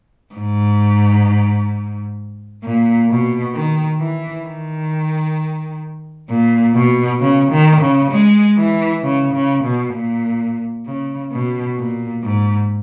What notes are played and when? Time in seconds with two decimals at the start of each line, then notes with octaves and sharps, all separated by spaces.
0.34 G#2
2.63 A#2
3.09 B2
3.54 D#3
4.00 E3
4.47 D#3
6.29 A#2
6.74 B2
7.20 C#3
7.51 D#3
7.81 C#3
8.11 G#3
8.57 E3
9.03 C#3
9.33 C#3
9.64 B2
9.94 A#2
10.86 C#3
11.32 B2
11.78 A#2
12.23 G#2